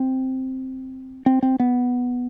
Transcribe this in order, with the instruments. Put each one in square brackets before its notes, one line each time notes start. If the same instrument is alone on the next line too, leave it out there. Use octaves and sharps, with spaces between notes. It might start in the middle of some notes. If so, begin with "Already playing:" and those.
Already playing: [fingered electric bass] C4
C4
C4
B3